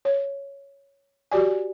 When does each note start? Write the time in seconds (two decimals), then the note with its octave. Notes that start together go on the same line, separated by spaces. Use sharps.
0.05 C#5
1.32 F#4 G4 D5 G#5